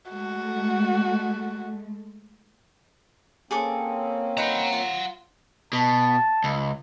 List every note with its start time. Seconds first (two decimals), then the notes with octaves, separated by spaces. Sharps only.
0.11 G#3 A3 F#4
3.51 A#3 C4 C#4 G#4 A4 D6
4.37 D#4 B4 F#5 A#5 C6
4.73 F4
5.73 B2 A5
6.44 C#2